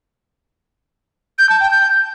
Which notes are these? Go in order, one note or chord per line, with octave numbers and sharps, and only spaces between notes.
G6
A5
G5
G6